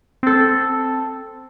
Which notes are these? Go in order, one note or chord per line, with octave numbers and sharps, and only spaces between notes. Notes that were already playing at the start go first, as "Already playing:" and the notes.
C4 A4